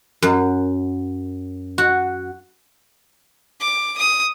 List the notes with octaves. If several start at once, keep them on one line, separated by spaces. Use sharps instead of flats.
F#2
F#4
D6
D#6